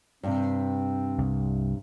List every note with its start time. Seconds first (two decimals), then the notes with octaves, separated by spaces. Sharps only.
0.23 G2 C3 C4
1.18 C2